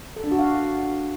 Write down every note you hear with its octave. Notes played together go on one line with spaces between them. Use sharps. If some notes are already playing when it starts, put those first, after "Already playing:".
A4
D4
F#4
F5